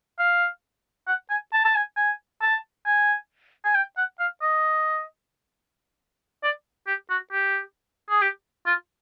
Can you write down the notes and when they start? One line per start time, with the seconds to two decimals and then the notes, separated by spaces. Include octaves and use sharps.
0.19 F5
1.08 F#5
1.30 G#5
1.53 A5
1.65 A5
1.75 G#5
1.97 G#5
2.41 A5
2.86 G#5
3.65 G#5
3.75 G5
3.97 F#5
4.19 F5
4.42 D#5
6.43 D5
6.87 G4
7.10 F#4
7.32 G4
8.10 G#4
8.21 G4
8.66 F4